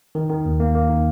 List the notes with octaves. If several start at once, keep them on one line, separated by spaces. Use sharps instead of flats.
D#3
D#3
D#2
A#3
A#3
D#3